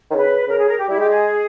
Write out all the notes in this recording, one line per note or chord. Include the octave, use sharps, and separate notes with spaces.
D#3 C#5
C#3 B4
C#3 A#4
G#4
A#4
G4
G3 E4
G#3 G4
G#4